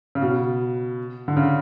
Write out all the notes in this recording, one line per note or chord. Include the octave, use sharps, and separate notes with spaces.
C#3
B2
D3
C#3